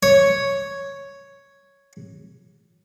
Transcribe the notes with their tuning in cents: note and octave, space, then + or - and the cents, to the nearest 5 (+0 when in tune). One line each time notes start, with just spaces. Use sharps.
C#5 +0